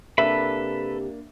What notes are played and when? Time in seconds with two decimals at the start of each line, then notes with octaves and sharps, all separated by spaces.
0.18 C3 A#3 D4 G4 A4 B4 E5 B5